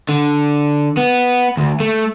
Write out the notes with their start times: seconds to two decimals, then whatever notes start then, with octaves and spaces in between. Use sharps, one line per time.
0.09 D3
0.97 B3
1.57 D2
1.80 A3